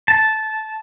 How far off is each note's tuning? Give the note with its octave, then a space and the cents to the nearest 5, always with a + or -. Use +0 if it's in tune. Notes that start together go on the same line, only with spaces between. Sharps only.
A5 -10